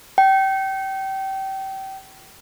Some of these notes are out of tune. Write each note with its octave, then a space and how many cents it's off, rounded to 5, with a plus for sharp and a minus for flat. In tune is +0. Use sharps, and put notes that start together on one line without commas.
G5 -25